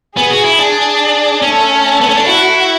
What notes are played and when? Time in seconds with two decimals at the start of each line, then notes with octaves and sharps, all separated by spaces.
0.17 B3 G#4
0.30 F#4
0.45 E4
0.58 D4 G#4
1.42 A3 C#4 A4
2.01 B3
2.09 C#4
2.17 D4
2.25 E4 F#4 F#5